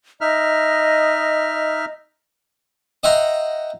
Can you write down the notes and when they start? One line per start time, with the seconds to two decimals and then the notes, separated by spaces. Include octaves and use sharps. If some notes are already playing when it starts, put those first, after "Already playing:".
0.21 D#4 D#5 E5 F6
3.03 D#5 E5 F#5 G5 A#5 C6